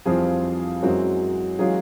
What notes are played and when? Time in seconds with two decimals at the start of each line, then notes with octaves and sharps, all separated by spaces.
0.05 F2 E3 F3 G3 C4 F4 G#4
0.82 F#2 E3 F#3 G#3 C4
1.59 E3 F#3 G#3 C#4 F4 G#4